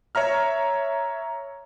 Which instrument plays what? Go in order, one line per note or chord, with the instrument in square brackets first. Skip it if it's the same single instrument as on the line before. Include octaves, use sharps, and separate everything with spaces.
[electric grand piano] C#5 E5 A#5 F6